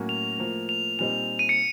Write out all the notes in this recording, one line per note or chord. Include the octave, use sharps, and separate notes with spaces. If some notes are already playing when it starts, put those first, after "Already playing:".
Already playing: A2 F#3 A#3 C#4 F#4
F7
A2 F3 A#3
F7
A#2 G3 C4 D#4 F7
D#7
C#7